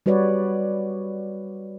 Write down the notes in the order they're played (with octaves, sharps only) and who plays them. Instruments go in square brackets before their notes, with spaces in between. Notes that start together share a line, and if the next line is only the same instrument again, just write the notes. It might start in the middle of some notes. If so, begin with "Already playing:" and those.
[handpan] G3 F#4 B4 C#5 D5